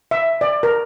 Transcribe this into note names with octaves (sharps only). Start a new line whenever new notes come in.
E5
D5
A#4